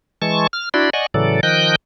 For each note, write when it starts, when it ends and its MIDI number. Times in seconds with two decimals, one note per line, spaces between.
0.22 0.47 52
0.22 0.47 56
0.22 0.47 81
0.22 0.47 85
0.53 0.69 89
0.74 0.90 62
0.74 0.90 64
0.74 0.90 66
0.74 0.90 74
0.74 0.90 83
0.74 0.90 84
0.93 1.06 74
0.93 1.06 75
0.93 1.06 78
0.93 1.06 80
0.93 1.06 85
1.14 1.40 45
1.14 1.40 49
1.14 1.40 52
1.14 1.40 54
1.14 1.40 69
1.14 1.40 74
1.43 1.75 51
1.43 1.75 53
1.43 1.75 75
1.43 1.75 79
1.43 1.75 90
1.43 1.75 91